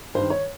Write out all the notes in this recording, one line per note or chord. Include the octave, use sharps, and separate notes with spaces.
G2 D#3 C5
C#5